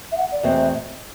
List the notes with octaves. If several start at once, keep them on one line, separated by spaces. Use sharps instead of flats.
E5
F#5
D5
E2 B2 A3 C4 E5